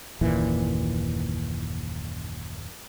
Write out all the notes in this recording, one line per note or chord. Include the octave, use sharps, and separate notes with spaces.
F#1 D#2 A#2 E3